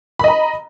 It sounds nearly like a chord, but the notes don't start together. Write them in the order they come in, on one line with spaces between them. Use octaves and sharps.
B5 D#5 A#5